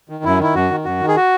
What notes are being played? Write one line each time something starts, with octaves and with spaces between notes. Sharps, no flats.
D#3
F#2 E4
D#3 E4
F#2 F#4
D#3
F#2 F#4
D#3
G#4
F#4